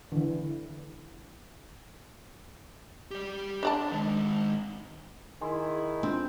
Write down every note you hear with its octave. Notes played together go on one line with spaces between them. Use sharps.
D3 E3
G4 D5
D4 C5 D5 A5
D#3 G#3
D#3 E4 G#4 G#5 C6
C4 D4 F4